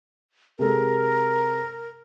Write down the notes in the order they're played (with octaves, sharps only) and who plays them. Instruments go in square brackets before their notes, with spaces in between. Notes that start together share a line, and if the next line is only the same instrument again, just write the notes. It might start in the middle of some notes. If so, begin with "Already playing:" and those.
[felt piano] C3 G#3 A4 [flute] A#4